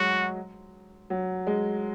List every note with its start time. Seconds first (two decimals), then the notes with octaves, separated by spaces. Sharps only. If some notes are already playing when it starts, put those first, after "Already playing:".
Already playing: F#3 G#3 F#4
1.10 F#3
1.47 G#3